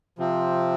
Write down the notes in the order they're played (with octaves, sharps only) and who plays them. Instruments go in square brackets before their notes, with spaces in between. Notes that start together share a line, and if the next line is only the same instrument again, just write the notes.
[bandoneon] C3 F3 C4